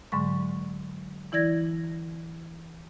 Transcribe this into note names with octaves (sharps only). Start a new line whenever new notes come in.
G#2 D3 F#3 G#3 C#6
E3 E4 D5 G#6 A#6